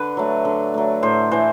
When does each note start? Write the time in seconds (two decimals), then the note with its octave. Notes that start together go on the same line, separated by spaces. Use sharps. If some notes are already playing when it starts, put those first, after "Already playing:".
Already playing: D3 B4
0.17 F#3 A3
0.45 D3
0.74 F#3 A3
1.03 A2 C5
1.31 E3 A3 C5